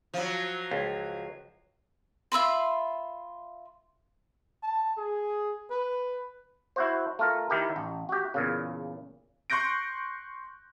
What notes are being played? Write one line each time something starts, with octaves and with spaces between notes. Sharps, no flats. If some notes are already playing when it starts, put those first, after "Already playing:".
F3 F#3
C#2
F4 E5 B5 C6
A5
G#4
B4
E4 F#4 C5
A3 F4 A#4
D#3 E4 G4 A#4
A1
F#4 G4
E2 A#2 C#3
C6 C#6 F#6 G6 A#6 D7